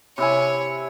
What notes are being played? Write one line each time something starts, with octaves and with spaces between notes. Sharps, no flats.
C3 E4 C#5 G#5